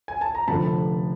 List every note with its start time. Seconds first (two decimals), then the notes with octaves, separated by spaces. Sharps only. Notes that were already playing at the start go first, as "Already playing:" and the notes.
0.08 G#5
0.21 A5
0.35 A#5
0.48 F1 F2 D3 F3 A5 B5